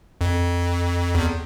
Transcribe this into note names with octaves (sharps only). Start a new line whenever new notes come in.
F2
E2